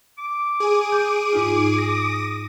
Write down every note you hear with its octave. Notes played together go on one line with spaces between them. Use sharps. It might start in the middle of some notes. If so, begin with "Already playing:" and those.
D6
G#4 D#7
G6
G#2 D#4 F4
D#6 A#6